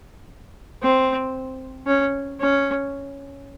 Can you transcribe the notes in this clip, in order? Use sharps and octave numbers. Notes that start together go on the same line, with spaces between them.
C4
C#4
C#4